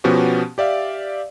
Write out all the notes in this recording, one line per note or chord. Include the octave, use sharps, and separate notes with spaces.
B2 F3 B3 C#4 F#4 G4
G4 D5 E5 F5